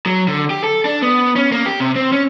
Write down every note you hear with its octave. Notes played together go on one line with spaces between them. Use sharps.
F#3
D3
G4
A4
D4
B3
C#4
A#3
G4
C3
C4
C#4